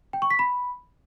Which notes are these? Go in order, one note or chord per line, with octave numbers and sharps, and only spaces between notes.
G5
C#6
B6
B5